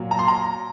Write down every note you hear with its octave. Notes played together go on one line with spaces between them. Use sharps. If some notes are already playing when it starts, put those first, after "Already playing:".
Already playing: A#2 F#3
A#5
C6
A#5